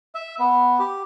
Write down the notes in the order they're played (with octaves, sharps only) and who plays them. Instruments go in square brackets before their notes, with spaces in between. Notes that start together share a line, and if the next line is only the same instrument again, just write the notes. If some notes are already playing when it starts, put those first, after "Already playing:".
[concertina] E5
B3
G4